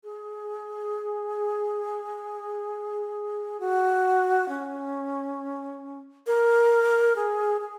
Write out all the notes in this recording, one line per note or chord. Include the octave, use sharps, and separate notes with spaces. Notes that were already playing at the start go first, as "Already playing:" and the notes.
G#4
F#4
C#4
A#4
G#4
G#4